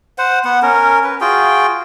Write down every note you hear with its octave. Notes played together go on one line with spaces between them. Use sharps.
C5 F#5
B3 F#5
C#4 A#4
B4
F4 F#4 G#4 G5